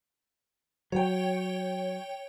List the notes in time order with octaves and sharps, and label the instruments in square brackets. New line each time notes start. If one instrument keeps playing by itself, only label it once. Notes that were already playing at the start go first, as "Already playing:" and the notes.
[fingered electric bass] F#3 [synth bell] C#5 G5